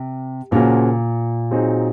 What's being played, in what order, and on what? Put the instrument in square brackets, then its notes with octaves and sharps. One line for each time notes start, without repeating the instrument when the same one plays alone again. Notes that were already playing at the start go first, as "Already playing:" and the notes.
Already playing: [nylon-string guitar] C3
[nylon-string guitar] A#2 [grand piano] C#3 F3 A#3 C#4 F#4
[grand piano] F#3 C4 D#4 G#4